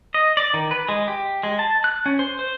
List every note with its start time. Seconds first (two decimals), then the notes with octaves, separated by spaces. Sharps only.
0.14 D#5
0.37 D5
0.54 D#3
0.71 B4
0.89 G#3
1.08 G4
1.43 G#3
1.59 A5
1.84 F#6
2.06 C#4
2.19 C5
2.39 C5